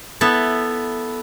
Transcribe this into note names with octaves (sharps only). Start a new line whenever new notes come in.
B3 E4 A4